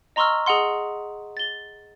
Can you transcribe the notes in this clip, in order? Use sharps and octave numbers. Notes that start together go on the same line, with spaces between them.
D#5 A#5 C6 C#6 E6 F6
G#4 D#5 F#5 C6
A6 G7